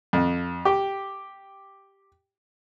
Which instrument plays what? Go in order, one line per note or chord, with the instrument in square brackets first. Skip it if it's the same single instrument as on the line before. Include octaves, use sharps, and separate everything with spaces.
[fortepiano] F2
G4